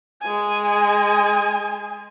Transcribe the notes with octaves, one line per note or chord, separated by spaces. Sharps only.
G#3 G#5